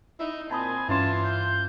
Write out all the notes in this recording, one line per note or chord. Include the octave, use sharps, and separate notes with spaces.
D#4 E4
A#2 C4 G#5 A5 B5 D#6
G2 E3 C#4 F4 A5 C6
G6